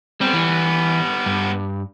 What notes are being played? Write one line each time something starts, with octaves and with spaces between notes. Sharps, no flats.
G3 B3 C4
E3
G2